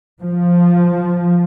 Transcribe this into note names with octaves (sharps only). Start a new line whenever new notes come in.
F3